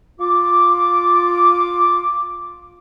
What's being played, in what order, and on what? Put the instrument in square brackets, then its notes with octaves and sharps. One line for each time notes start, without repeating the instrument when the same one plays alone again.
[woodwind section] F4 D6